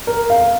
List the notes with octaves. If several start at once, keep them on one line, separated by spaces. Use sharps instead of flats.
A#4
F5